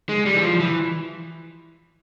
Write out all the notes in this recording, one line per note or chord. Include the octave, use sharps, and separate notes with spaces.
G#3
G3
E3
F3
E3